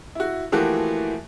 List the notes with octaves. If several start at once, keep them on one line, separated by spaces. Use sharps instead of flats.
E4 F#4
E3 F3 A3 A#3 F#4 G4